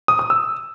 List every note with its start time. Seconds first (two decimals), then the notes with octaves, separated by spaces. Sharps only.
0.08 D#6
0.19 D#6
0.30 E6